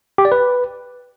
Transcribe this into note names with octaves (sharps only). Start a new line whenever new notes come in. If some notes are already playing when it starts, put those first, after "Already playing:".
G4
D5
B4